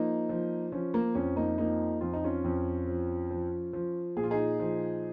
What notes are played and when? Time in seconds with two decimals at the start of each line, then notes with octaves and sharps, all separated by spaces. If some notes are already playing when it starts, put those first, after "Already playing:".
Already playing: F3 A#3 D#4
0.29 F3
0.72 F3 C#4
0.94 A#3
1.15 F2 C#4
1.36 A#3 D#4
1.58 F3 A#3 D#4
2.01 F2 F4
2.13 D#4
2.24 C#4 F4
2.44 F2
2.87 F3
3.30 F3
3.73 F3
4.17 A#2 G#4
4.24 F4
4.31 D#4 G#4
4.59 F3